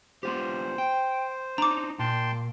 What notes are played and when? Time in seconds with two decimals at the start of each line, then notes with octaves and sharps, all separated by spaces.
0.23 B3 F4 G4 C5
0.78 G5
1.58 D4 D#4 A#5 D6
1.99 A#2 G5 A5 C6